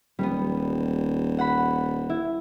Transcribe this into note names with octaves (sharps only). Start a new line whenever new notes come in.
D#1 G3 B3
F#5 B5
E4